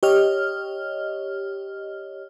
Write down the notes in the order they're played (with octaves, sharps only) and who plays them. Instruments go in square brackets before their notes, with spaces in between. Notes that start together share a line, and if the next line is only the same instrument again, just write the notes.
[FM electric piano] G4 C#5 D#5 F6